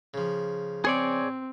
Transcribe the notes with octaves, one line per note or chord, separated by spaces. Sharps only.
C#3 F3
C4 G#4 C#5 D5